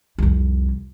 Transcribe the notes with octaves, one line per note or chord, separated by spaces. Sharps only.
C2 F2